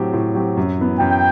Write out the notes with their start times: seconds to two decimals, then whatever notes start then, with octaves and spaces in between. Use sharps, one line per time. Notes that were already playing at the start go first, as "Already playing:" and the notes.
Already playing: A2 F#3 C4 G4
0.14 A2
0.35 F#3 C4 G4
0.57 F#2
0.78 E3 B3
1.00 F#2 G5